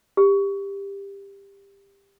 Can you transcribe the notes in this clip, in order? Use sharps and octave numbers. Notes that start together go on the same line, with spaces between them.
G4